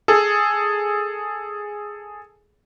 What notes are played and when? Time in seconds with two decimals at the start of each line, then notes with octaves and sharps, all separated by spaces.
0.08 G#4 A4